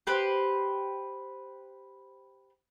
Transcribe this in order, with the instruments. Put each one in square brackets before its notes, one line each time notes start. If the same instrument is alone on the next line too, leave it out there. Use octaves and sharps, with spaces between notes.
[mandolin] G4 B4 C5